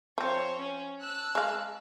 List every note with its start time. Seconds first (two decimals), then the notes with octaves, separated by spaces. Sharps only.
0.18 F3 C4 C5 C#5 C#6
0.58 C#4
0.99 A5 E6 F#6
1.35 G#3 F5